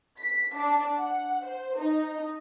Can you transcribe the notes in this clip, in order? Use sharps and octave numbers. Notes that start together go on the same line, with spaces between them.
B6
D4
F#5
C5
D#4